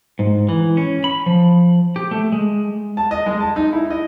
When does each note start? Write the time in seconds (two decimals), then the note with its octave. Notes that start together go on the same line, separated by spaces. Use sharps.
0.19 G#2
0.49 E3
0.77 C#4
1.04 B5
1.26 F3
1.96 G4
2.11 A3
2.32 G#3
2.97 A5
3.11 D#5
3.26 G#3
3.41 A5
3.56 D#4
3.72 E4
3.90 D#5